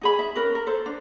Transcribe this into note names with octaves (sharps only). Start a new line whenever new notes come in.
D#4 G#4 B5
E5
C#4 A#4 B4
A#4
A4 C5
D4